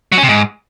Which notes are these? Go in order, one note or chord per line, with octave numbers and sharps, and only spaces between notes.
F#3
C#4
C3
G#2